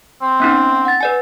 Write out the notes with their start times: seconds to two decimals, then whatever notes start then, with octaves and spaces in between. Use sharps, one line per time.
0.22 C4
0.40 B3 C#4 D#4
0.85 F#5 A6
1.01 B4 D5 G#5